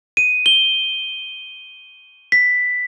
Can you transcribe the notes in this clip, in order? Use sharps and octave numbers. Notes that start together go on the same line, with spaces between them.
D#7
G7
B6